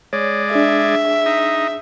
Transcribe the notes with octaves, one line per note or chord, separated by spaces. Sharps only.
G#3 C#5 D5
D4 G#4 E5
D#4